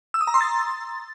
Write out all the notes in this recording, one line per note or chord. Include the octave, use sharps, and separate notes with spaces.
E6
D#6
A#5
C6
A6